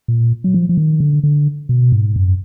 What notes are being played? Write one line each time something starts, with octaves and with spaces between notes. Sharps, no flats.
A#2
F#3
F3
F3
D#3
D3
D3
B2
G#2
F#2